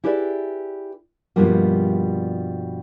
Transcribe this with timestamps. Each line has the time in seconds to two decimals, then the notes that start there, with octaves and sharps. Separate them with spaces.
0.04 E4 G4 G#4 B4 D5 E5
1.36 G2 B2 F3 G3 A#3